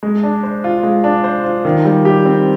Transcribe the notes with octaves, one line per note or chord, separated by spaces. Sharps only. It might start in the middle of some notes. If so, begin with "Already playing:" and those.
G#3
D4
C5
F4
G#3
D4
C5
F4
D#3
G3
G4
C4